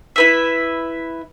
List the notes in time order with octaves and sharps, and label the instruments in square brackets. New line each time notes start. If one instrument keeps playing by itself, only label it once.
[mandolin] E4 B4 E5